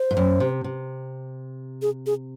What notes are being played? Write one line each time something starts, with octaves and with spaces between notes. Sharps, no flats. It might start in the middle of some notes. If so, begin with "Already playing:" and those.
Already playing: C5
G#2
F#2
C3
C3
G#4
G#4